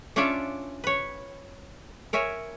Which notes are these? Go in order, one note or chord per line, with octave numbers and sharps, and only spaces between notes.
C#4 D4 F4 C#5 D5 E5
B4 C#5
A#4 C#5 E5 G#5